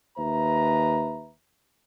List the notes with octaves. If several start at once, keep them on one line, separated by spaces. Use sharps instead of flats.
D#2 B4 E5 A#5